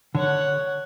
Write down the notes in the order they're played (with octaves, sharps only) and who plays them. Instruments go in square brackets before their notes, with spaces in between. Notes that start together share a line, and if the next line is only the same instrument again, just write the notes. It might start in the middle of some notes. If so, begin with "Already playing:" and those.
[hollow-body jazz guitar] D3 [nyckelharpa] C#5 F#5